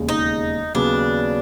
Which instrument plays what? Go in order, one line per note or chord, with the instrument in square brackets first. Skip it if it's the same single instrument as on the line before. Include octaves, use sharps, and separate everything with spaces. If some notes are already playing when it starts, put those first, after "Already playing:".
Already playing: [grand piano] E1 D#2 C#3
[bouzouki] D#4
[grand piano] D#2 C#3 F#3 B3 [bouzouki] D4